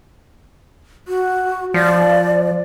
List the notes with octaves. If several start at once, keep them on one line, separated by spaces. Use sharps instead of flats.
F#4
F3 D5